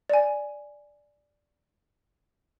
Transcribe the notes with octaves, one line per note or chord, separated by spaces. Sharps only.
D5 G#5